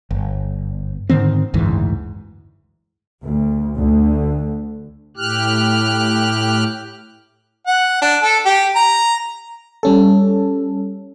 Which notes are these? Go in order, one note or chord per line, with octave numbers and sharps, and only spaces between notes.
G1
G#2 D3 D#3 C4
F#1 D2 G#2 E3
D2
D2
A2 G4 F6 F#6
F#5
D4
A4
G4
A#5
G3 C#4 A4